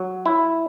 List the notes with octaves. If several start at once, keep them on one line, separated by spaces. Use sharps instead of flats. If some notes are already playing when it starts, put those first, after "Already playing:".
Already playing: F#3
E4